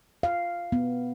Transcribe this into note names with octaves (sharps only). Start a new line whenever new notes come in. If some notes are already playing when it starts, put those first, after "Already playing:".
F5
B3